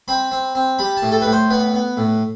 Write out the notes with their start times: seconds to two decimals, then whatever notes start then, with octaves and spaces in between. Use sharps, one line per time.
0.08 C4 B5
0.31 C4
0.55 C4
0.79 G3 B5
0.97 A5
1.02 A2
1.12 A4
1.21 A2 B4
1.32 C5
1.50 B3 B4
1.74 B3
1.97 A2